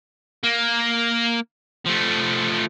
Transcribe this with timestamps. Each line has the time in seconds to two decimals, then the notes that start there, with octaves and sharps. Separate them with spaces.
0.44 A#3
1.86 F3 A3